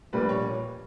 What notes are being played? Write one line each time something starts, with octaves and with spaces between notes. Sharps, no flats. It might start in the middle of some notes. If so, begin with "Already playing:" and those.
A#1 A#2 G3 B4
C#5